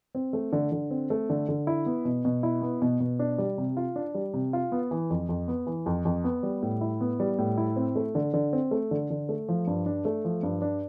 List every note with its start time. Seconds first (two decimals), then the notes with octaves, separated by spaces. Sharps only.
0.15 C4
0.33 A3
0.52 D3
0.72 D3
0.91 C4
1.10 A3
1.30 D3
1.48 D3
1.67 E4
1.86 B3
2.05 B2
2.25 B2
2.43 E4
2.62 B3
2.82 B2
3.00 B2
3.19 D4
3.38 G3
3.58 C3
3.77 F4
3.96 D4
4.15 G3
4.34 C3
4.53 F4
4.72 B3
4.91 E3
5.10 F2
5.29 F2
5.48 B3
5.67 E3
5.86 F2
6.05 F2
6.24 B3
6.43 G3
6.62 A2
6.81 E4
7.01 B3
7.20 G3
7.38 A2
7.58 E4
7.76 C4
7.96 A3
8.15 D3
8.34 D3
8.53 C4
8.71 A3
8.91 D3
9.10 D3
9.29 A3
9.48 F3
9.67 G2
9.86 D4
10.05 A3
10.25 F3
10.43 G2
10.62 D4